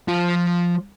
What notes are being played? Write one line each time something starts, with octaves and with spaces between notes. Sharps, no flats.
F3 F4